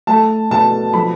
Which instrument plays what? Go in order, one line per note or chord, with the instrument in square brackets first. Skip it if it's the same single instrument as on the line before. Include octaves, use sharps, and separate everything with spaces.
[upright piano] A3 A5
B2 A5
F3 B5